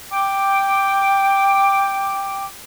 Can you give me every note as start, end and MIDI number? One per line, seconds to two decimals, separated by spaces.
0.11 2.45 79
0.11 2.45 86